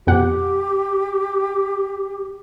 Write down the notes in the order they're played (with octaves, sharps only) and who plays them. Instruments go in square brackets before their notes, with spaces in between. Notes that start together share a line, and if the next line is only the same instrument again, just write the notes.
[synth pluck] F2 B2 F#5 [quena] G4